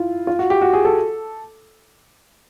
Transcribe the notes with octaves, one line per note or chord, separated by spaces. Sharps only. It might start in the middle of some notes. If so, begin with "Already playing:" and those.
Already playing: E4 F4
F4
F#4
G4
F#4
G#4
A4